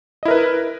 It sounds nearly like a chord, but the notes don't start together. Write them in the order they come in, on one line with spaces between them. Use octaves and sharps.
D#5 E4 A#4 B4